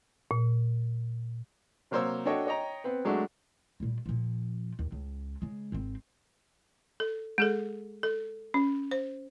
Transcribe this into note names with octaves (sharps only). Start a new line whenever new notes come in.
A#2
C3 F#3 A#3 C5 C#5 E6
D4 F#4 A4 C#5 D#5 G5
C#5 D#5 G5 A#5
B3 C4 B4
F#3 G#3 A3 D4 F#4
A#2 G3
A#2 F3
D#2
C#2
C#3 G#3
G#1 C4
A4
G#3 G#4 A4
A4
C#4
C5